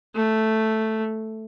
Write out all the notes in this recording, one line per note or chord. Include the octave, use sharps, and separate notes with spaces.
A3